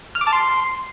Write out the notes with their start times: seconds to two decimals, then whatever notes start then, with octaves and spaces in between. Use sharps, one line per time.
0.15 F6
0.21 D6
0.27 A5
0.33 C6